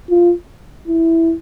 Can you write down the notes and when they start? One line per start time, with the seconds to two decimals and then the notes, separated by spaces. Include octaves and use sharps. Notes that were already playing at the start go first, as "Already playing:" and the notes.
0.10 F4
0.88 E4